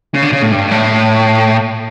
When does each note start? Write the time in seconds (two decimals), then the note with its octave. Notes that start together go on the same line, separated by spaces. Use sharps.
0.14 C#3
0.23 D3
0.33 C#3
0.42 A2
0.52 G2
0.71 A2